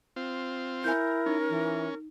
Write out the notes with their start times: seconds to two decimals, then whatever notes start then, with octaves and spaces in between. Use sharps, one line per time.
0.16 C4 F4
0.84 E4 A#4 G#5 G6
1.26 C#4 D#4
1.50 E3